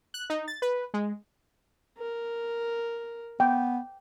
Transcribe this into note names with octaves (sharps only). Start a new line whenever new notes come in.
F#6
D#4
A6
B4
G#3
A#4
B3 G5